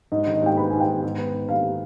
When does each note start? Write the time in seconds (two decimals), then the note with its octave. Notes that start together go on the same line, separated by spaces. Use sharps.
0.12 G#2 D#5
0.23 D#5
0.27 D#3
0.35 D#5
0.43 G#2 G5
0.57 B3 B5
0.70 G#2 G#5
0.80 G5
0.88 D#3
1.03 G#2
1.18 B3
1.33 G#2
1.49 D#3 F5